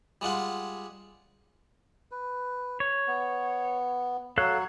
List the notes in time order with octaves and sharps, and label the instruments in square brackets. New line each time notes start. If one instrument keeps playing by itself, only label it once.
[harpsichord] G3 G#3 F4 F#5
[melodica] B4
[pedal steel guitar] C#5
[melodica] B3
[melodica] F#3 C#5 [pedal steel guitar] A4 F5 F#6